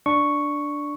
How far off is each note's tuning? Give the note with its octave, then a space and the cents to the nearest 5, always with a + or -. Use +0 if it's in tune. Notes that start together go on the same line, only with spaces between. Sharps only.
D4 +0 C#6 +0